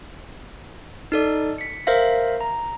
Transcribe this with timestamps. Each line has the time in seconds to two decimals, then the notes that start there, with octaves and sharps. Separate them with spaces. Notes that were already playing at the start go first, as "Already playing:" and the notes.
1.12 D#4 A4 D5
1.58 B6 C#7
1.87 A#4 C5 E5 F5 A#6
2.41 A#5